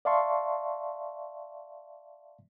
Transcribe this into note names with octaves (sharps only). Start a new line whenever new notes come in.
D5 E5 F5 A5 C6 C#6